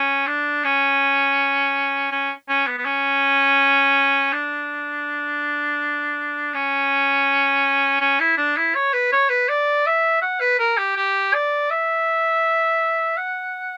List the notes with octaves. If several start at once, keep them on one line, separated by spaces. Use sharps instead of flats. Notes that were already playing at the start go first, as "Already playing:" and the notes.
Already playing: C#4
D4
C#4
C#4
C#4
B3
B3
C#4
D4
C#4
C#4
E4
D4
E4
C#5
B4
C#5
B4
D5
E5
F#5
B4
A#4
G4
G4
D5
E5
F#5